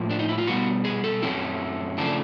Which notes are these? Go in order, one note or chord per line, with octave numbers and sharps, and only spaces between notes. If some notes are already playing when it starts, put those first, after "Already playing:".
Already playing: A2 F3 A#3
D4
D#4
E4
F4
B2 G3 B3 F#4
G#4
A4
F#2 D#3 F#3 A3 C4 E4
C#3 F3 A3 C4 D4